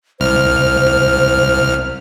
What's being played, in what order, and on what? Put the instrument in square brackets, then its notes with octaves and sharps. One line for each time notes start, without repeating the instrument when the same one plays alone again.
[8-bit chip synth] C2 F6 [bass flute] C5